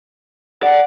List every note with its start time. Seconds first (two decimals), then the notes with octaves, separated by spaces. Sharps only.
0.63 D5 F#5